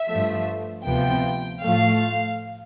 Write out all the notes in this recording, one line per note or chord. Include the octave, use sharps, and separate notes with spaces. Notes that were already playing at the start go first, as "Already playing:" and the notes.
Already playing: E5
G2 F3 A3
D2 C3 F3 B3 G5
A2 F3 A3 F5